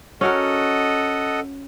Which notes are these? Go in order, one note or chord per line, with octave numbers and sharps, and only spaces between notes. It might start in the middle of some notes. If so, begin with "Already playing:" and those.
C#4 F#4 A4 A#4 D#5 F#5